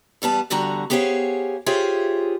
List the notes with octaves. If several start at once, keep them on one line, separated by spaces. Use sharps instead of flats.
E2 G3 B3 A5
E2 D3 G3 F#4 A#5
B3 G4 G#4 C5 C#5 F5
F4 G4 G#4 C5 C#5 E5